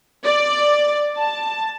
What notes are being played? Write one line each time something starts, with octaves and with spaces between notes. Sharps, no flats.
D5
A5